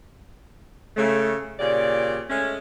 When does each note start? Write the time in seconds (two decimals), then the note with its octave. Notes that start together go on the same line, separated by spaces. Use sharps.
0.97 C#3 A3
1.60 A#2 C#3 G4 D5
2.30 G#3 A3 C#4